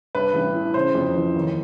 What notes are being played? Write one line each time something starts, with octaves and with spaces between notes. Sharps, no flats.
G2 B4
A1
E3
C#3 C5
F2
E3
D#2